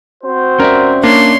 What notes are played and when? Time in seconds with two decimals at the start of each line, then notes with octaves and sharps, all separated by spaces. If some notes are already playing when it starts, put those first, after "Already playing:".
0.24 C4 F#4 C5
0.60 C#4 A#4 D5 E5
1.03 A#3 D4 C#5 C6